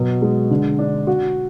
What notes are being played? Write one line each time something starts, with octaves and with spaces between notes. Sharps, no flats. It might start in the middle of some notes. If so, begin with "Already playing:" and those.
Already playing: B2 F#3
G#3
D3
D4
F#4